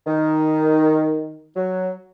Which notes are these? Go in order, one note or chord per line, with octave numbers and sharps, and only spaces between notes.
D#3
F#3